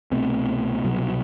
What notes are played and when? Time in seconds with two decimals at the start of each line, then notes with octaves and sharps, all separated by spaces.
0.11 C2 B2 A3 C4
0.84 C2 B2 F#3